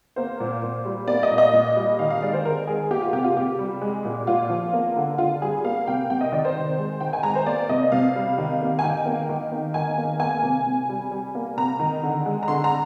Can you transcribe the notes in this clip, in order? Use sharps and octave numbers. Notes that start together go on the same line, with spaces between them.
A#3 C5
A#2
A#2
G3
A#3 D5
D#5
A#2
D#5
A#2
G3
D#3 F5
F5
G#3 D5
C5
D#3 A#4
G#3 G#4
A#3 G4
F4
C3 G4
F4
C3 G4
G3
G#3
A#2
A#2 F4
F3
A#3
D3
D3 F4
G3 G#4
A#3 F5
C3 G5
C3 G5
D#5
D#3 D5
C5
D#3
G#3
D#3 G5
G#5
G#3 A#5
C5
A#3 D5
C3 D#5
C3 F5
G3
D#3
A#3
G#5
D#3 G5
A#3
D#3
A#3
D#3 G#5
A#3
A#3 G#5
C3
C3
G3
G3
A#3
C3 A#5
D#3
D3
G#3
A#5
D3 C6
A#5